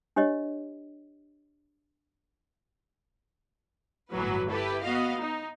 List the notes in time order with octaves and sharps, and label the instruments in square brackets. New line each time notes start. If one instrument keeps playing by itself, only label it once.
[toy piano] D4 G4 C#5 D#5
[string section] G1 A2 E3 F#3 B4
E4 G4 A4 B4
B3 F#4 D#5 F5
D#4